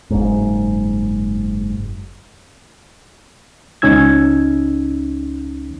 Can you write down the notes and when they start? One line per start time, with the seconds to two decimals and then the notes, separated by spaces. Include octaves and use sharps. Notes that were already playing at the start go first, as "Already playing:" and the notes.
0.10 F#1 G#2
3.82 C#2 C#4 D#4 E6 G#6